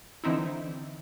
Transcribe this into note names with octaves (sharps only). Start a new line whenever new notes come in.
D3 E3 C4 D#4 E4